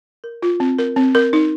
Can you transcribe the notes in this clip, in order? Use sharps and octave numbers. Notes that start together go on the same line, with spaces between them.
A#4
F4
C4
A#4
C4
A#4
D#4